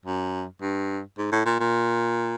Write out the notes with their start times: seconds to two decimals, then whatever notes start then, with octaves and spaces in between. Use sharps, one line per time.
0.06 F#2
0.61 G2
1.18 G#2
1.32 A2
1.46 A#2
1.60 A#2